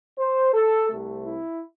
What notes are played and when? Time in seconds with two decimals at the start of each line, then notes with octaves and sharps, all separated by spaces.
0.18 C5
0.53 A4
0.89 C2 C3 A3
1.25 E4